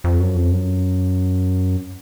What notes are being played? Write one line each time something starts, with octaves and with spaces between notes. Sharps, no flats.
F2
F#2
F2
F#2